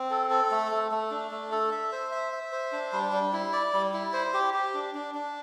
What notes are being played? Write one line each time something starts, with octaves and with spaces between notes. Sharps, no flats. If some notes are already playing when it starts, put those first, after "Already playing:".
Already playing: C4
A4
A4
A3
A3
A3
D4
A3
A4
E5
C5
E5
E5
C5
D4
G3
G3
E4
D5
G3
E4
C5
G4
G4
D4
D4
D4